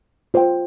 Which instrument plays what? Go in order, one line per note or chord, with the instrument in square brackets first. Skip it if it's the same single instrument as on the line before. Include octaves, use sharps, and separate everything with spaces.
[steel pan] F4 C5 G5